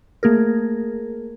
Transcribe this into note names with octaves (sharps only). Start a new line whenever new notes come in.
A3 A#3 G#4 A#4